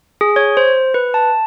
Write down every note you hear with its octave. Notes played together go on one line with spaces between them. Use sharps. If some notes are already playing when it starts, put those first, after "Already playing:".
G#4
C#5
C5
B4
A5